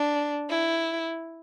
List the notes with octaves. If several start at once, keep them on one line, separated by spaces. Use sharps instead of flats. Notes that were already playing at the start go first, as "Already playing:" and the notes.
Already playing: D4
E4